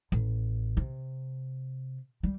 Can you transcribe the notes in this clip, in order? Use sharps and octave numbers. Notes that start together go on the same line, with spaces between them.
A1
C3
G3